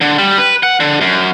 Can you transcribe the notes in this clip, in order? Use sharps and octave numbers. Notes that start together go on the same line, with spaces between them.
D3
G3
B4
F#5
D3
F#2